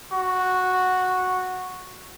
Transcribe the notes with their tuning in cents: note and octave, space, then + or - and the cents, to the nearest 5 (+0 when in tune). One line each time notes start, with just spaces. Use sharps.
F#4 -5